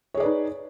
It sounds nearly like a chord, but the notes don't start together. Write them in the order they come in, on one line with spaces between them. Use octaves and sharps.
C#5 G#4 D5 B4 D#4